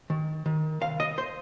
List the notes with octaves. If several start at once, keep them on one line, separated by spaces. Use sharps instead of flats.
D#3
D#3
C2 F5
D#5
C5